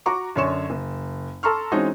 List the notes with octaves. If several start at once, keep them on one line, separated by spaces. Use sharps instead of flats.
F#4 A#5 C#6 D6
F#2 D3 C#5 C6 C#6 E7
F#1
A4 A#5 C6 C#6 F6
E3 G#3 C4 C#4 D#4 F#4